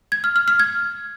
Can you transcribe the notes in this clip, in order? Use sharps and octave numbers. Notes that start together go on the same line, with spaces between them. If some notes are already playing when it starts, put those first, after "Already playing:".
G#6
F6
F6
F6
G#6